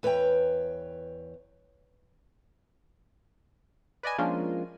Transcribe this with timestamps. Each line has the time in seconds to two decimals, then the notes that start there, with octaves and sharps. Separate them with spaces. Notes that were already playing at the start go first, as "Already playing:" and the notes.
0.03 E2 B4 C#5 D#5 G5
4.03 B4 D5 D#5 G#5
4.18 F3 G#3 A#3 C#4 D4 F4